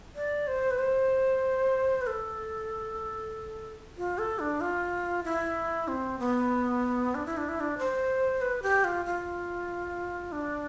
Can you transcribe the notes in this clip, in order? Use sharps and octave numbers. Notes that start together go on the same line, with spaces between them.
D5
C5
B4
C5
B4
A4
F4
A4
D4
F4
E4
C4
B3
D4
E4
D4
E4
D4
C5
B4
G4
F4
F4
D4